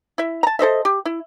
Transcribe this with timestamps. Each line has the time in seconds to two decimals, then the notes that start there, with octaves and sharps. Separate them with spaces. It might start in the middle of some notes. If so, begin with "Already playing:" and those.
0.18 E4 E5
0.43 A5 A#5
0.59 A4 C5 D#5 E5
0.85 G4
1.05 E4